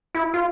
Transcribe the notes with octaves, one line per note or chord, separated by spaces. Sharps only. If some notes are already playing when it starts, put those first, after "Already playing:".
E4
F4